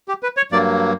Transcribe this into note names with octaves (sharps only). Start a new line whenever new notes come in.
G4
B4
C#5
G2 F#3 A#3 D5